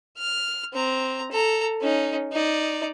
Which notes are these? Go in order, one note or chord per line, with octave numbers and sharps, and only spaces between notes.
F6
C4 A#5
A4 A#5
C#4 D#4
D#4 D5